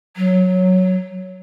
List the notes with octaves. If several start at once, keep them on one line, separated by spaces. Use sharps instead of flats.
F#3